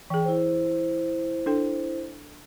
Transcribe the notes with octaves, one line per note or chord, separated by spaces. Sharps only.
E3 G#4 G5
E4 C5
D4 A4 G5